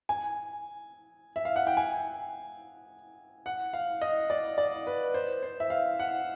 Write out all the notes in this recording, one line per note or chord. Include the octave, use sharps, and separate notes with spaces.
G#5
E5
F5
F#5
G5
G#5
F#5
F5
D#5
D5
D5
B4
C5
C5
E5
F5
F#5